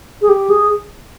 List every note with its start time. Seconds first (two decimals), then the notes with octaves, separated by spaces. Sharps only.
0.22 G#4
0.29 G4
0.50 G#4